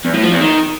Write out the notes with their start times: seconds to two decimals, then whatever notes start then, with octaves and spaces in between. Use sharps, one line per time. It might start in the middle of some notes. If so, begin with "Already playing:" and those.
0.05 E2
0.14 A2
0.23 F3
0.32 E2
0.41 D#3